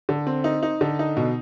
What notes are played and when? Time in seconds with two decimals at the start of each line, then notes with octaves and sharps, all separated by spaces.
0.09 D3
0.27 C4
0.44 D#4
0.63 D#4
0.81 D3
0.99 D#4
1.17 B2